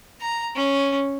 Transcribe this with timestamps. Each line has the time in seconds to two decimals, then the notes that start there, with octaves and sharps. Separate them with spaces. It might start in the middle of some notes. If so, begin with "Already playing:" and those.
0.21 A#5
0.56 C#4